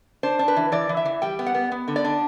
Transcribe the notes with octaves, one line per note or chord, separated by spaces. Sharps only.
D4 C5
D4
B4
E3
E3 D5
E3
E5
E3
G3 G5
B3
F#5
B3
B3
D3
D5
D4